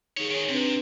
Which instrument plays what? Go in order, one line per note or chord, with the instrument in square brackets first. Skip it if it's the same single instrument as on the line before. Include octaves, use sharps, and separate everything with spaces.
[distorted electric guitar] D#3 C#5 [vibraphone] D#4 G#4
[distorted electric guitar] D#3 G#4 [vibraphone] C#5
[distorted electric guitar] C3 [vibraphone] C4 D4 B4